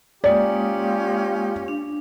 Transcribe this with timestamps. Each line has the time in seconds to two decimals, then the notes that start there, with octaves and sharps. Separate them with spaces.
0.24 G#3 A#3 C#4 F4 G4 D5 D#6
1.68 D4